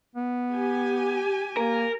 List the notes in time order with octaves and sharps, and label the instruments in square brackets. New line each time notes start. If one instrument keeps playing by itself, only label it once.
[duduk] B3
[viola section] G4 G#5
[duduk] A#3 [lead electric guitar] A#4